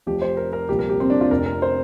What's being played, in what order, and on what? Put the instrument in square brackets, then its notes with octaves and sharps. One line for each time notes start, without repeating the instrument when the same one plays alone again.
[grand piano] F1 F2 F3 G4
C5
A#4
A#4
C2 A#2 F3 G4
A#4
G4
C4
D4
F4
F1 F2 C3 A#4
A#4
C5